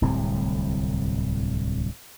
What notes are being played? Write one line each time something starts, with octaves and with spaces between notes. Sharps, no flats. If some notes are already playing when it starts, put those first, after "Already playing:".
D1 C2 A2 C4